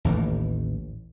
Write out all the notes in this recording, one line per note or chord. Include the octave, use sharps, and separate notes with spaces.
A1 D#2 A2 E3